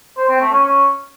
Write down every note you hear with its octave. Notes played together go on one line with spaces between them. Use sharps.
C5
C4
A3
C#4
C#4